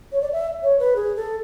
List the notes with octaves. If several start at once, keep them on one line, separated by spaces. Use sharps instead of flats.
C#5
D5
E5
C#5
B4
G#4
A4